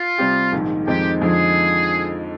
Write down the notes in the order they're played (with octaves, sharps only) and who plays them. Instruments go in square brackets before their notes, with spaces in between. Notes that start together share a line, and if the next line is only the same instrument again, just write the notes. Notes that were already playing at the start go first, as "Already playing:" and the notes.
Already playing: [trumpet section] F4
[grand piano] C3 G3 C4 G4
A#1 G#2 D#3
[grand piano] F2 D#3 G#3 C4 D#4 [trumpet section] G4
[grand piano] F2 D3 F3 G#3 D#4 [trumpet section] G#4